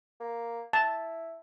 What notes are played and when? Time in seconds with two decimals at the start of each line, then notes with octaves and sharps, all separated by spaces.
0.20 A#3
0.73 E4 A5